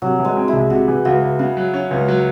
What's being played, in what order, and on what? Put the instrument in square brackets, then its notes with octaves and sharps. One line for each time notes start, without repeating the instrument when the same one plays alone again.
[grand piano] C3 [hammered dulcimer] F#3
[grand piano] E3
[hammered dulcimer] G#3
[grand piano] C4
[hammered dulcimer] E4
[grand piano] C2
[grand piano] C3 [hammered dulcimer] F#4
[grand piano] E3
[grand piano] C#2 [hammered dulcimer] F#4
[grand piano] C#2
[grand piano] C#3 [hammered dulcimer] F#4
[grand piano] F#3
C#4
C#2
F#3